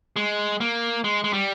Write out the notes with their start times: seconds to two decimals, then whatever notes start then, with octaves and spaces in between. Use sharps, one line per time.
0.16 G#3
0.60 A#3
1.04 G#3
1.24 G#3
1.33 G3